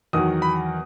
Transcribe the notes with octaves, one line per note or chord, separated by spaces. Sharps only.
E2 D#3 F#3 D#6
B5